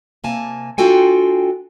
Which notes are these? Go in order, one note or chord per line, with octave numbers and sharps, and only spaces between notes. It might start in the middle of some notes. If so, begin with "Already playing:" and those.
C3 A#3 G#5 A5
D4 F4 F#4 A4 G5 G#5